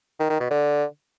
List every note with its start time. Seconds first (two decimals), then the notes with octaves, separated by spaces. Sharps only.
0.20 D#3
0.30 D#3
0.40 B2
0.50 D3